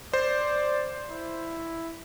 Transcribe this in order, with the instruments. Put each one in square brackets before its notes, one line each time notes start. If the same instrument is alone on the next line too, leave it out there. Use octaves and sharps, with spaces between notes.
[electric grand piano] C5 [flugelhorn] D5
[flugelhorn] E4